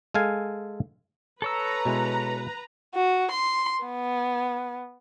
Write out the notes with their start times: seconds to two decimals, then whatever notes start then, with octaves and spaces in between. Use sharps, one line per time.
0.14 G#3 A4 F5 G#5
1.42 A4 B4 C#5 A#5 E6
1.85 B2 G#3 E4
2.95 F#4
3.31 C6
3.85 B3